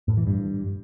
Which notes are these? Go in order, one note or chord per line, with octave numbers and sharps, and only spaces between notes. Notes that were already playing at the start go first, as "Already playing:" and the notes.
A2
E3
G2